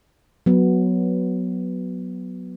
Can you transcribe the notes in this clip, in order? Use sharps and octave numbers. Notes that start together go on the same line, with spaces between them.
F#3 B3